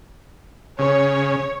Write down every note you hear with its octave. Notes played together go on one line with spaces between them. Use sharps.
C#3 C#5